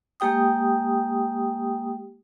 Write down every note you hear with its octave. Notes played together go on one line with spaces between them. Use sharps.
G#3 A#3 G4 G5 D#6